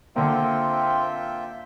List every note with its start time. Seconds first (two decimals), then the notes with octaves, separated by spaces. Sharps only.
0.16 D3 A#3 C4 F4 E5 G5